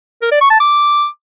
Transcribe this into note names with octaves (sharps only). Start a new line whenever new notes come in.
A#4
D5
C#6
A5
D6